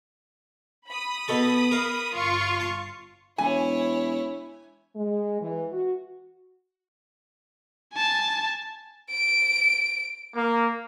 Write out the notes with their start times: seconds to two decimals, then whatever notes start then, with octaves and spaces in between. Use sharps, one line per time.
0.89 B5 D#6
1.28 B2 A4 A5
1.71 A#4 F5
2.15 G1 F4 C#6
2.60 A5
3.38 E1 E4 C#5 G#5
4.96 G#3
5.41 E3
5.72 F#4
7.93 G#5 A5
9.11 D7
10.35 A#3